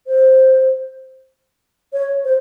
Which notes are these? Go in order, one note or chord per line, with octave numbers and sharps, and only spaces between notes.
C5
C#5
C5